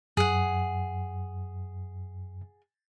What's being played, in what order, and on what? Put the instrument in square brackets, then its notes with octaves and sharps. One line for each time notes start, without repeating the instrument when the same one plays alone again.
[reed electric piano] F#2 [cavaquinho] G#4 F#5